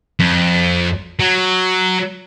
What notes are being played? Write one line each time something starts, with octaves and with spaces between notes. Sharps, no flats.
F2
F#3